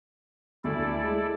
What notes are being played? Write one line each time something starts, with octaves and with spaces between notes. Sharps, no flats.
D2 E4 A4 D5
G#3